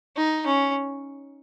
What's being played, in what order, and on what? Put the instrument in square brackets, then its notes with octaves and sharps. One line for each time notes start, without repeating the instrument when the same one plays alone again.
[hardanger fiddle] D#4
C#4